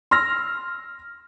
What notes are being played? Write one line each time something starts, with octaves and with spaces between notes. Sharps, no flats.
C6 E6 F6 A#6